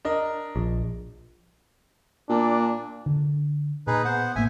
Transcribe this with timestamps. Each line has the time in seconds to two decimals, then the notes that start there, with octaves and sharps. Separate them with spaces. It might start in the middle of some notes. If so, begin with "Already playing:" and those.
0.05 D4 A#4 D#5
0.56 A#1
2.29 A#2 D4
3.06 D3
3.87 A#2 D#4 G#4 B4
4.05 B3 C5 F#5
4.36 A1 A2 A#3 E5 G#5